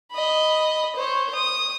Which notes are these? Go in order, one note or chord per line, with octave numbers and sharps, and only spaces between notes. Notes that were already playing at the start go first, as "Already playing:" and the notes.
D#5 B5
C5 C#5
D#6